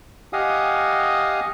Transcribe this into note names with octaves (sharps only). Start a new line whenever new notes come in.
G4 D#5 F5 F#5 G#5 D#6